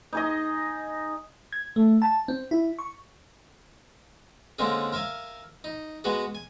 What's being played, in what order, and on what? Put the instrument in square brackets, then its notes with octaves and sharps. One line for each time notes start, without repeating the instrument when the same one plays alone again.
[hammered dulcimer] D#4 G#4 D#5
[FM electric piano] G#6
A3
A5
C4
E4
C#6
[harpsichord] D3 G#3 A#3 C4 C#4 G#4
A#4 E5 F5 G#5
D#4
G#3 B3 F#4 G#4
G#5